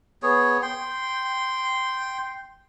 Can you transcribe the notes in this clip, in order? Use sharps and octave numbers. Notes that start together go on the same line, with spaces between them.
B3 G#4 C#5
G5 C6